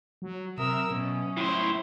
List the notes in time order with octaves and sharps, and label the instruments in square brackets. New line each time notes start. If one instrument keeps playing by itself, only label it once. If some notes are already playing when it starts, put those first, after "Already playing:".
[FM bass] F#3
[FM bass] C3 [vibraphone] F#3 E5 D#6 [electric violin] A#4 E6
[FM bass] B2 [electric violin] C#4
[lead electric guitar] A2 C5 [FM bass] E4